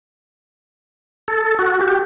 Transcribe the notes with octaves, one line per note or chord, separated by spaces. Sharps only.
A4
F#4
G4